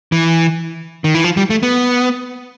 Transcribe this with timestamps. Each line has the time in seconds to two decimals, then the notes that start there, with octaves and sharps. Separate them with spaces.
0.12 E3
1.04 D#3
1.15 E3
1.24 F3
1.37 G3
1.50 A3
1.63 B3